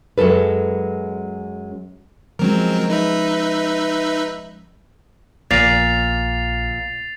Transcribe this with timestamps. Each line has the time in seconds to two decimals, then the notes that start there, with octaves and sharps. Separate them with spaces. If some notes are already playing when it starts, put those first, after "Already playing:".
0.18 F#2 F#3 G#3 A4 B4
2.39 F3 F#3 G#3 C4 C#4 A#4
2.90 D#4 B4 E5
5.51 A#1 A#2 A6 C7 F7